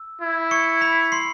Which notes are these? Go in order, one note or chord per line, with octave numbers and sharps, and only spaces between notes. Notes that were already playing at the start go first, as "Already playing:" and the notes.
Already playing: E6
E4
C#6 C#7
B5 B6
C6 C7